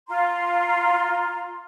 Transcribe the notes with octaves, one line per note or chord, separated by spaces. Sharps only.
F4 A#5 C6